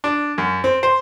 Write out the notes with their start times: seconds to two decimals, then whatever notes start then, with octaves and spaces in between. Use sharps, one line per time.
0.04 D4
0.38 F#2
0.64 C4
0.83 C5